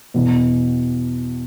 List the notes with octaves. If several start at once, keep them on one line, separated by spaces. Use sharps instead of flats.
E2 B2